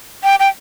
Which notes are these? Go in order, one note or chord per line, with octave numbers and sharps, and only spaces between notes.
G5
G5